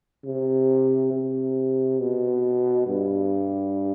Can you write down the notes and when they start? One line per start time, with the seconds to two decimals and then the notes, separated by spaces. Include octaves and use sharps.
0.25 C3
1.12 C3
2.00 B2
2.87 G2